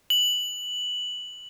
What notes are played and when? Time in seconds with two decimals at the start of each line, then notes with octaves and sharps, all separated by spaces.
0.10 F#7